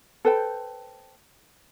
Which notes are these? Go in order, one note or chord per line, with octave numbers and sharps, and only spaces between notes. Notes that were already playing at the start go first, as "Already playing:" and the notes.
A4 B4 C5 G5